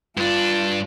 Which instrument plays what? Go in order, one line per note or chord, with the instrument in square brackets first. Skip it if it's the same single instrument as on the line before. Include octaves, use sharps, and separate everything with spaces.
[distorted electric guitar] G2 D4 [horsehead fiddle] F4